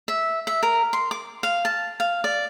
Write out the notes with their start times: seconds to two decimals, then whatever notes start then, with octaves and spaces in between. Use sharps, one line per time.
0.08 E5
0.47 E5
0.63 A#4
0.93 C6
1.11 D6
1.43 F5
1.65 A5
2.00 F5
2.24 D5